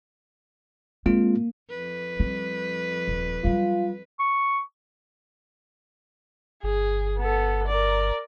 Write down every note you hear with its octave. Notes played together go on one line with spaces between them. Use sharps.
G#3 A#3 C4 F4
F2 B4
G3 C4
D#1
F#3 G3 F4
C#6
G1 G#4
B3 A4
A#4 D5